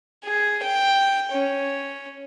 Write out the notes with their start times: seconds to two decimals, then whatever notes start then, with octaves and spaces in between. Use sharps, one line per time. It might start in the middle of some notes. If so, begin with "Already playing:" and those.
0.24 G#4
0.64 G5
1.32 C#4